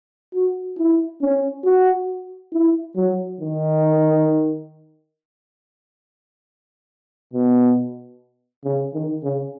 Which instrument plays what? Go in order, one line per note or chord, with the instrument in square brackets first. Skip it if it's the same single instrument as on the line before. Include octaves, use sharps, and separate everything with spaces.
[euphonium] F#4
E4
C#4
F#4
E4
F#3
D#3
B2
C#3
D#3
C#3